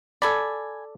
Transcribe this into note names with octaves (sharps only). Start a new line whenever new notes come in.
A4 D5 G#5 B5